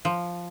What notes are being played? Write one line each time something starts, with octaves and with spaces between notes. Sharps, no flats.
F3